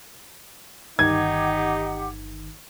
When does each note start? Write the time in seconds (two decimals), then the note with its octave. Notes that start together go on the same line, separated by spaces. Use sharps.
0.99 G1 D#3 D#4 G4 F#5 D6 G#6